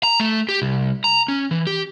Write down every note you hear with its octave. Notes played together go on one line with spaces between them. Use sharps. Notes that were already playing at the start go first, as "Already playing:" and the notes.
A#5
A3
G4
C2
A#5
C#4
E3
G4